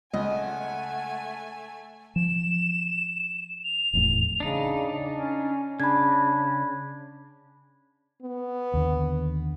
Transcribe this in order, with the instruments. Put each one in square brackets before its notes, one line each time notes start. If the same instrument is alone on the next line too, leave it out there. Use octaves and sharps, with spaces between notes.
[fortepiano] C#2 [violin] A3 G#5 [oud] D#5 [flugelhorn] F#5
[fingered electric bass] F3 [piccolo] E7
[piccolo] F7
[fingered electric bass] F1 E2 A2
[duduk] C#3 [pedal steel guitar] D4 D#4
[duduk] C#4
[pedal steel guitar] C#3 [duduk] D4 [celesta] B5 G#6
[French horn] B3
[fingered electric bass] D#2 D3